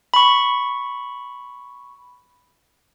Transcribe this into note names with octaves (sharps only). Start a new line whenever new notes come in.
B5 C#6